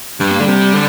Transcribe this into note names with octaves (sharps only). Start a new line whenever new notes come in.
G2 G3
A#3
D3 G3
C3
D3